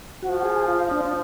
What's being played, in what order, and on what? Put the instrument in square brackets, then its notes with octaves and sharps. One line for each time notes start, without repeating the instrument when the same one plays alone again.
[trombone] F3 [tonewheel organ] F#4
[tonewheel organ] G#4
F4
D4
D4